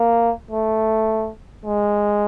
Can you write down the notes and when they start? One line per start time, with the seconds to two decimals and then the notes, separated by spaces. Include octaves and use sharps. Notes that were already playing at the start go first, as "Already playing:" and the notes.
Already playing: A#3
0.51 A3
1.65 G#3